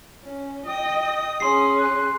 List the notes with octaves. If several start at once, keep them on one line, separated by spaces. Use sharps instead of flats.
C#4
D#5 G5 D#6
C#4 G#4 C6 C7
F#6